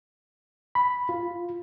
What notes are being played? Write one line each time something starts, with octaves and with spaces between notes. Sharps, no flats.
B5
F4